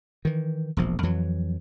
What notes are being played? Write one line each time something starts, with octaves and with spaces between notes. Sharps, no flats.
D#3 E3
E1 A#1 F3
F2 E3 F#3